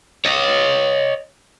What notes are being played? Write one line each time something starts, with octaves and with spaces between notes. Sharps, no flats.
C#5 D#5